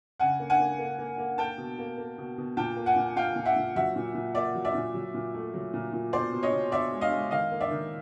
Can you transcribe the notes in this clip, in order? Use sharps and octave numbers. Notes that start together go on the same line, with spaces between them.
C#3 F#5 G#5
A#3
F#5 G#5
A#3
A#3
A#3
A#3
A#3 G5 A5
B2
A#3
A#3
B2
B2
A#2 G5 A5
A#3
F#5 G#5
A#2
A#2 F5 G5
A#2
E5 F#5
A#2
F#3 E5 F#5
A#2
A#2
A#3 D5 E5
F#3
D5 E5
A#2
F#3
A#2
A3
F#3
A#2
A#2
B2 C5 D5
B2
C#5 D#5
B2
B2 D5 E5
G#3
D#5 F5
G#3
D#3 D#5 F5
A#3
D5 E5
D#3